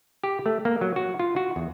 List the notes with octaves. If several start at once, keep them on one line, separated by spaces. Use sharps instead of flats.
G4
A3
A#3
F#3
F#4
F4
F#4
E2